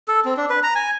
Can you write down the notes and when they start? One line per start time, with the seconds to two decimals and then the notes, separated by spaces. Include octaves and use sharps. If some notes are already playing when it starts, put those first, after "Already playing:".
0.08 A4
0.25 C4
0.37 D4
0.50 B4
0.63 A#5
0.75 G#5